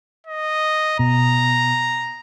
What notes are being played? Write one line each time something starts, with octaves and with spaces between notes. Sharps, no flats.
D#5
B2 A#5